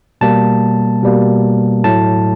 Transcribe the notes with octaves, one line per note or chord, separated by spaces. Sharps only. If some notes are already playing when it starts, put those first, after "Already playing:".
B2 G3 A#3 A5
B2 G3 A#3
A2 F#3 A3 A5